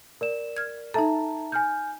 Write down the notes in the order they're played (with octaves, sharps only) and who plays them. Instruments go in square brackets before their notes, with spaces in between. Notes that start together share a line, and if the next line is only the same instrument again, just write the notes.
[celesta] A#4 D5 E7
[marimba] F6 G#6
[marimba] D#4 A4 [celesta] E5 A5 A#5
[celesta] G#5 F6 G6